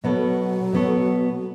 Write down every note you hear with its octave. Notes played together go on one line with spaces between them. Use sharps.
B2 F#3 B3 A4 C#5
B2 B3 A4 C#5